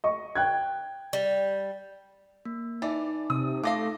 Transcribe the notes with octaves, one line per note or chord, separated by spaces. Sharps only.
D#5 C#6
G5 F#6 G#6
G3
A#3
E3 D#4 D5
C3 D#6
A3 F4 A4 F5 D6 A#6